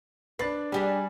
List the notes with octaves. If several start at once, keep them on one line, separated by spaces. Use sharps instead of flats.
D4 B4 A6 C7
G3 D4 G4 G#4 G#5